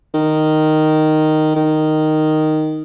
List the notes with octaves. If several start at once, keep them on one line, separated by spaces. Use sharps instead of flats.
D#3
D#3